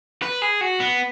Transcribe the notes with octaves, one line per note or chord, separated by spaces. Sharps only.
B4
G#4
F#4
B3